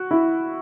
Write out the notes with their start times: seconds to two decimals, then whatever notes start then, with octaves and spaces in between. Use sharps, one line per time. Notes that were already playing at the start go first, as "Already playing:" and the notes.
Already playing: F#4
0.11 E4